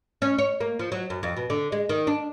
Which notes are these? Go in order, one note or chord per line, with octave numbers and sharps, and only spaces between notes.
C#4
C#5
A#3
F3
F#3
F#2
F2
B2
D3
G#3
D#3
D4